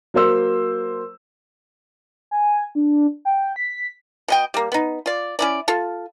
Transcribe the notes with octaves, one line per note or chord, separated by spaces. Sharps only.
F#3 A#3 C5 E6
G#5
D4
G5
B6
B2 D#5 G5
G3 A#3
B3 D#4
F4 D5
C#4 E4 D5
F4 A4